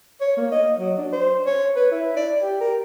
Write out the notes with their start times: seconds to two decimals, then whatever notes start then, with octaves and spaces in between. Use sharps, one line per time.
0.21 C#5
0.37 A#3
0.52 D#5
0.78 F#3
0.98 D4
1.12 C5
1.46 C#5
1.76 B4
1.91 E4
2.16 D5
2.42 G4
2.61 A#4